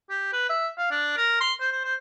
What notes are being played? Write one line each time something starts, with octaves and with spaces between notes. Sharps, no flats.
G4
B4
E5
F5
D4
A#4
C6
C5
C5
C5